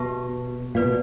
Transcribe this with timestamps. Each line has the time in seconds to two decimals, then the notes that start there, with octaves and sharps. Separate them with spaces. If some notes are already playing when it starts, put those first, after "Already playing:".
Already playing: B2 G4 B4 E5 A5 C#6
0.75 A#2 B4 D5 F5
0.84 B2